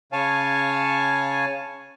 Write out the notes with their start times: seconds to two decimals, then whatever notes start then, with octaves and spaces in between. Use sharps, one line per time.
0.12 C#3 C#5 F5 G#5 A5